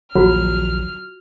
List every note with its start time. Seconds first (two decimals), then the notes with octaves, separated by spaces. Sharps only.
0.15 A#1 D#2 F#3 F4 F#4 F6